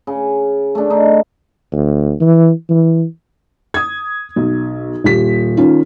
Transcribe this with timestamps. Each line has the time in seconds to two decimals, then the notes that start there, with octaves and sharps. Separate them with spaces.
0.07 C#3
0.75 A3 D4
0.90 D#4
1.72 D2
2.21 E3
2.70 E3
3.74 D#6 G#6
4.36 B1
5.04 D#1 G4 B6
5.57 D#3 C#4 F4